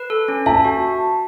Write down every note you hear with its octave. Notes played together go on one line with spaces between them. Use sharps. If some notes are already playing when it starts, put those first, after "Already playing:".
Already playing: B4
A4
C#4
E5 A5
F#4